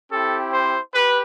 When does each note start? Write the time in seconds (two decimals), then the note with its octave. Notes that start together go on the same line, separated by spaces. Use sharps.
0.12 C4 E4 G4 A4
0.53 C5
0.94 G4 B4